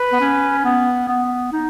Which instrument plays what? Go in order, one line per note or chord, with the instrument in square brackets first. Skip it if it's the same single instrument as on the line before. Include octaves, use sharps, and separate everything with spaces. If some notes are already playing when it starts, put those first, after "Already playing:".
Already playing: [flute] B4
[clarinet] B3
C#4
B3
B3
D#4